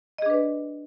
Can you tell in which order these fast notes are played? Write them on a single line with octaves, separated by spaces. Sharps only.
D#5 G#4 D4 B4 D5